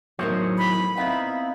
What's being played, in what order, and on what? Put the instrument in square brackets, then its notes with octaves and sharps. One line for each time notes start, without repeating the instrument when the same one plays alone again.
[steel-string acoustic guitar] E2 A2 D#3 [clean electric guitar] F#3 C5 C#5
[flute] B5
[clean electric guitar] B3 C4 [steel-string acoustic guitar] D#4 E4 [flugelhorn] F5